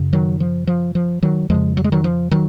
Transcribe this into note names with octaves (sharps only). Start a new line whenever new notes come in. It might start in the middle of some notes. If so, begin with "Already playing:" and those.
Already playing: F#2 C#3
D#3 F#3
F3
F3
F3
D#3 F#3
F2 C#3 F3 G#3
F#3
G#3
D#3 F#3
F3
D#3 F#3